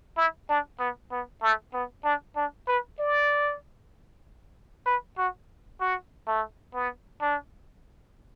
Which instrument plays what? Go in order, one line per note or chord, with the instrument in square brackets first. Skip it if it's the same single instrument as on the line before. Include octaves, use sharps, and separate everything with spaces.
[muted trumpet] E4
D4
B3
B3
A3
B3
D4
D4
B4
D5
B4
F#4
F#4
A3
B3
D4